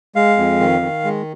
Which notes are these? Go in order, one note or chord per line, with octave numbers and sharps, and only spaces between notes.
G#3 F5
F2
D#3
D#3
G#3